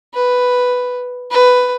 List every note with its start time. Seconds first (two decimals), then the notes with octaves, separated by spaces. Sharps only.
0.14 B4
1.30 B4